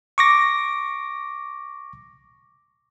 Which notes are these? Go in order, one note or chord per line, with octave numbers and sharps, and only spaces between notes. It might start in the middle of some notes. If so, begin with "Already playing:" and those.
C#6 D6 A#6